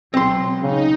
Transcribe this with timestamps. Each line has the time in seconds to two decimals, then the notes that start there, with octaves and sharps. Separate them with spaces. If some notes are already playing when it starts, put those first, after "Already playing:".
0.14 C#2 B2 F#3 C4 C6
0.62 C#3 D#4